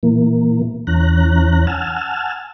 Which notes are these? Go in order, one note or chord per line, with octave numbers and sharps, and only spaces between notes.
A#2 E3 A#3
E2 E3 C#4 A#5 F#6
F#5 G#5 A5 E6 F6